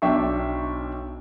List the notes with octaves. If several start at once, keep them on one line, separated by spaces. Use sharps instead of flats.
B1 D4 E5 G5 C#6